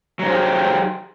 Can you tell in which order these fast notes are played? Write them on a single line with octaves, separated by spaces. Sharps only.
F#3 D#4 C5 G#4 G4